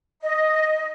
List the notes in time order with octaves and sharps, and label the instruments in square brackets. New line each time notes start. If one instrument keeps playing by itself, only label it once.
[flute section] D#5